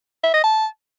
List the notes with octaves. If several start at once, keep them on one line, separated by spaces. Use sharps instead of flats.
E5
D#5
A5